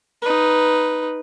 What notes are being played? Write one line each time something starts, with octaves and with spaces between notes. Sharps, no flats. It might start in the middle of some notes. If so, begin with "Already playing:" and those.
D#4 B4